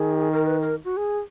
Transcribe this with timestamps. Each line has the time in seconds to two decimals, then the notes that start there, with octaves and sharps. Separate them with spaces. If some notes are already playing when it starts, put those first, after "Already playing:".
Already playing: D#3 G#4
0.31 A#4
0.46 B4
0.60 A#4
0.85 F#4
0.97 G#4